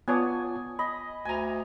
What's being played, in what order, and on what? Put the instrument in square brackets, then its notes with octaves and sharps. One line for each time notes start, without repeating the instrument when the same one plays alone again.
[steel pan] B3 C#5 D5 [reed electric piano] F4 A5 D#6 [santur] G#5
[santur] D#5 [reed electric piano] B5
[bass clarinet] D2 [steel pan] G#5 A#5